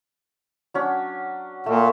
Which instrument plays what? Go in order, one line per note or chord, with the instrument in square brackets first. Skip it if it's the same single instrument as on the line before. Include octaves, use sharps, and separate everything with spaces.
[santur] F#3 C#4 D4
[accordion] A#2 [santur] A3